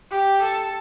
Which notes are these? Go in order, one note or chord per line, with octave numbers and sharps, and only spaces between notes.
G4
A4